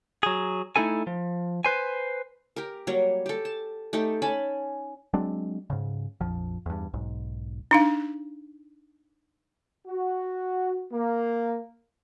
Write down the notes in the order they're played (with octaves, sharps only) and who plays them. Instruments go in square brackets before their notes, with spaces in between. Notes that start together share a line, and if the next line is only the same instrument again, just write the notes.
[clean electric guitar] F#3 G#4
A3 D#4 E4 A4 G#5
F3
B4 C5 G#5
[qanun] G4 A#4
F#3 G3 A#3 C#5
G4 A4
A5
A3 D#4 G4 A4
C#4 G#5 A5 B5
[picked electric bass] F#3 G#3 C4 D4
G#2 C#3
A#1 F2 F3
E2 G2
B1 G#2
[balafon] D4 D#4 F5
[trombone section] F#4
A#3